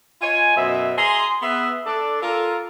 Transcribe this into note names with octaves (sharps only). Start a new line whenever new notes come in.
F4 C#5 D#5 G#5
F#2 B2 C5 E5
G#4 G#5 A#5 C6
B3 G#4 B4 E5
D4 A4 D5
F4 A4 A#4